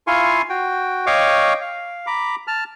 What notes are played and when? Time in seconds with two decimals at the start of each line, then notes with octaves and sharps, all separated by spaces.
0.07 E4 F4 F5 G#5 C6 C#6
0.49 F#4 G5
1.07 C#5 D#5 F5 G5 C#6 D6
1.61 F5
2.07 A#5 B5 D6
2.47 A5 F6